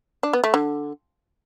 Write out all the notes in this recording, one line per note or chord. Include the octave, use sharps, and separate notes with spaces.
D4
B3
A3
D3